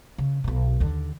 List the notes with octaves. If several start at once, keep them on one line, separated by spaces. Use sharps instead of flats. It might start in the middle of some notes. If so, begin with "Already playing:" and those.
C#3
B1 B2
D#2 D3